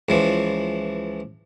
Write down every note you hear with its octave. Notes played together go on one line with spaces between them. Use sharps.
C#2 E3 F3